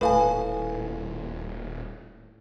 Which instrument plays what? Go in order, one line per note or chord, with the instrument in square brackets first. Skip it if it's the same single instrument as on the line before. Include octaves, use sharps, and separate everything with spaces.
[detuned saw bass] D#1 [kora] A2 [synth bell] B4 F5 G#5